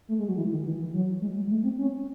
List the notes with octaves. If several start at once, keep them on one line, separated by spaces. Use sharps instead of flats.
A3
G#3
F#3
E3
D#3
E3
E3
F#3
G#3
G#3
A3
C4
C#4